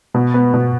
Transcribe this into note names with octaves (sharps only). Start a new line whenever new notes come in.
B2
B3
B2